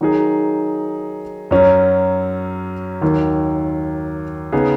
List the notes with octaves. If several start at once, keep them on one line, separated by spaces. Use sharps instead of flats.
D#3 F#3 D#4 G#4
F#2 F#3 C#4
D#2 D#3 F#3
C#3 B3 D#4 G#4